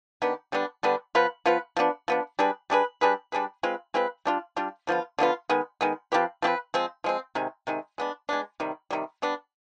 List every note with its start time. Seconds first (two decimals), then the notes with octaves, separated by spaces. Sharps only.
0.22 D#3 B3 D4 G4
0.52 D3 G3 B3 D4
0.83 D3 G3 B3 D4
1.15 F3 B3 F4 B4
1.46 F3 B3 F4 B4
1.77 F3 B3 D4
2.08 F3 B3 D4
2.39 G3 D4 G#4 B4
2.70 G3 D4 G#4 B4
3.01 G3 D4 G#4 B4
3.32 G3 D4 G#4 B4
3.63 G#3 C4 F4 B4
3.94 G#3 C4 F4 B4
4.25 G3 D4 F4
4.56 G3 D4 F4
4.87 D3 F3 B3 F4
5.19 D3 F3 B3 F4
5.49 D#3 G#3 B3
5.81 D#3 G#3 B3
6.12 F3 C4 G4 B4
6.42 F3 C4 G4 B4
6.74 F3 G#3 C4
7.04 F3 G#3 C4
7.35 C3 D#3 G#3
7.67 C3 D#3 G#3
7.98 G#3 B3 D4
8.29 G#3 B3 D4
8.60 C3 D#3 G3
8.90 C3 D#3 G3
9.22 G3 B3 D4